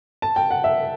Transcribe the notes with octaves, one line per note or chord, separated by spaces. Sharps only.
A5
G5
F#5
E5